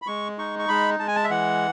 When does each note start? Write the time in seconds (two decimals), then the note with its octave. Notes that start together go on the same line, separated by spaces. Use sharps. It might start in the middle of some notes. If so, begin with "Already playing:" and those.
0.02 B5
0.07 G#3 C#6
0.38 D#4 C#6
0.59 C#6
0.68 G#3 B5
0.99 G#3 A5
1.08 G#5
1.16 A5
1.24 E5
1.30 E3 F#5